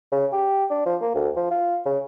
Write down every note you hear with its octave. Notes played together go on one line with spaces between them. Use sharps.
C#3
G4
D4
F3
A#3
D2
F3
F4
C#3